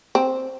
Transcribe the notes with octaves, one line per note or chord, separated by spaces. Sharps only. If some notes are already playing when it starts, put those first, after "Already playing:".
C4